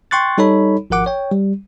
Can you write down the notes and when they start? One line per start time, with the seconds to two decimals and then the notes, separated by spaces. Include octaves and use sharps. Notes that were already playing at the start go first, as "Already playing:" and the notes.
0.11 G5 C6 C#6 F#6 A6
0.38 G3 D#4 A4 C#5 B5
0.90 G#1 F3 A#4 F#5 D6
1.06 C#5 G5
1.31 G3